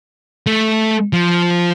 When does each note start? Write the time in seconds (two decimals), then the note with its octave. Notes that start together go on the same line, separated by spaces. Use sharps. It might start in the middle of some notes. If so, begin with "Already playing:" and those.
0.47 A3
1.13 F3